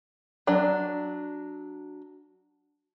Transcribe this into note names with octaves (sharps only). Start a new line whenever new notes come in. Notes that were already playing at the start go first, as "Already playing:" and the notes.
F#3 D4